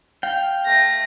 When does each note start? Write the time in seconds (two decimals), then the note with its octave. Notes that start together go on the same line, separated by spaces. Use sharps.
0.23 F5 G5
0.65 A3 A#6